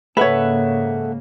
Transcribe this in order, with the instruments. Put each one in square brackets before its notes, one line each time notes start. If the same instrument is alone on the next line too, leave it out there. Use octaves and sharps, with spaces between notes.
[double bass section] G#2 C#3 A#3 [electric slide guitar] A4 E5 F#5 [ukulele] B4 C#5